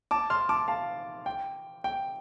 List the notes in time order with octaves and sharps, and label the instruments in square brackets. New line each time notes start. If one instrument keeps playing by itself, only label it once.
[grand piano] A5 D6
C6 F6
A5 D6
F5 A5
G5
G5